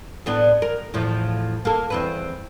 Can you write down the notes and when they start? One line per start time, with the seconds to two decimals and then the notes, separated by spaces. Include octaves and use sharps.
0.26 A2 B3 D4
0.62 A#4
0.94 E2 A2 F3
1.65 A#3 A4
1.90 E2 C4 B4